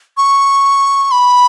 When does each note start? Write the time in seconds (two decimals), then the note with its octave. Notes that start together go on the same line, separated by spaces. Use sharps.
0.17 C#6
1.11 B5